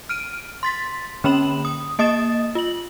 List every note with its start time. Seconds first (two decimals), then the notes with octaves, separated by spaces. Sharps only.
0.09 F6 D7 D#7
0.63 C6 A6 B6
1.24 D3 A#3 C#4 B5 E7 F#7
1.65 D#6
1.99 A#3 D#5 D#6 A6 E7
2.55 F4 F#7